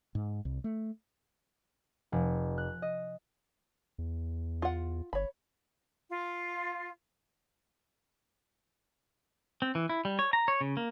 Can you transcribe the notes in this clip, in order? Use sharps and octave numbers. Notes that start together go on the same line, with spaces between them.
G#2
C2
A3
F1
F#6
D#5
E2
F4 F#5
G1 C#5 B5
F4
C4
E3
E4
G3
C#5
A#5
C#5
C#3
A#3